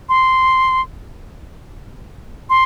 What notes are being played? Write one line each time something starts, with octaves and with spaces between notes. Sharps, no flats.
C6
C6